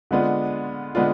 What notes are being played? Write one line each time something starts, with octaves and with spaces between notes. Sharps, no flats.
D3 G#3 B3 D4 F4
D3 G#3 B3 D4 F4